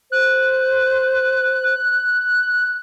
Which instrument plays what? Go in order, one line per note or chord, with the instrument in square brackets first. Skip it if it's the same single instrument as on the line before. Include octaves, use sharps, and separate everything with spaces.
[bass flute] C5 [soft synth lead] F#6